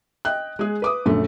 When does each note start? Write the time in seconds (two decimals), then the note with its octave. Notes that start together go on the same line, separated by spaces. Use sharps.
0.25 D#5 G5 F#6
0.59 G#3 G#4
0.82 B4 D6 D#6
1.06 A#1 F#2 D3 A3